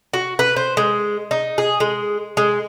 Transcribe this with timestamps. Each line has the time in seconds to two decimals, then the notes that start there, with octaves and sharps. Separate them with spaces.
0.14 F#4
0.39 B4
0.56 C5
0.77 G#3
1.31 D#4
1.58 G#4
1.80 G#3
2.37 G#3